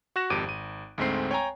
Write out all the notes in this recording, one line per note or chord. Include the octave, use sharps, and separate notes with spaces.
F#4 C#6 F#6 A#6 E7
G#1 F2 G4 D6 D7 D#7
G#1 D#7
D2 G#2 G#3 A3 C4 C7
C#5 G5 G#5 A#5